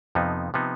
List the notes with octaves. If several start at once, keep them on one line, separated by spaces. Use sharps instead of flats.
F2 C3 F3 B3 D#4
C3 F3 B3 D#4